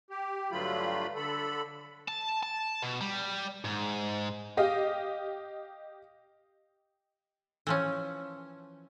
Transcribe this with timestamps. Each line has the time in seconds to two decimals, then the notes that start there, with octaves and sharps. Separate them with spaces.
0.10 G4
0.51 G2 D3 F#3 A3 F4 B5
1.16 D3 A4 B5
2.08 A5
2.43 A5
2.82 B2
3.01 G3
3.65 G#2
4.57 G4 D#5 F5
7.67 E3 F3 C#4